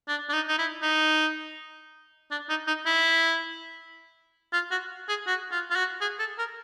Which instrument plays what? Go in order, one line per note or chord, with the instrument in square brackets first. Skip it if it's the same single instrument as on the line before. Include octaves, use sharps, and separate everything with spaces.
[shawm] D4
D4
D#4
D#4
E4
D#4
D4
D#4
D#4
E4
F4
F#4
G#4
F#4
F4
F4
F#4
G#4
A4
A#4